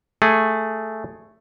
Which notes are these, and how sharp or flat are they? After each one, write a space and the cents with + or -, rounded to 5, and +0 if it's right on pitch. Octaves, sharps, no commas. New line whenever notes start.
A3 +0 G#4 +5